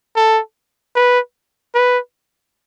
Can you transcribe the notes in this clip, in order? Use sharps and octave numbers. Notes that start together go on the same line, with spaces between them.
A4
B4
B4